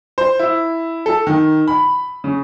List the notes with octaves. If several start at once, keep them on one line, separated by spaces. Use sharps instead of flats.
C5
E4
A4
D#3
B5
C#3